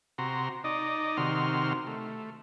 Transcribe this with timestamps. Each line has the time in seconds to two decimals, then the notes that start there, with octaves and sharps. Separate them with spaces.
0.18 C3 F#4 A#5 C6
0.64 D#4 D5 D#5
1.17 C3 D#3 F#4 C6 F6
1.87 A3